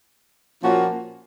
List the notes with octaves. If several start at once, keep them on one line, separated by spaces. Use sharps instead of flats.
A#2 F3 A#3 C#4 F#4